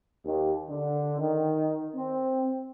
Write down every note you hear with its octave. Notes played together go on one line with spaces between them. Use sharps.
D#2
D3
D#3
C4